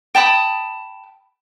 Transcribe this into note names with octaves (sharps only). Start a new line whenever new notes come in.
G5 A5 B5 D#6